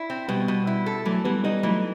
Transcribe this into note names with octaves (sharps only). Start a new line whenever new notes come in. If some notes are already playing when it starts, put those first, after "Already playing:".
Already playing: E4
C4
B2 G3 B3
B2
E4
A4
E3 F#3 A3
E3 G3 B3
G3 B3 D#4
E3 F#3 A3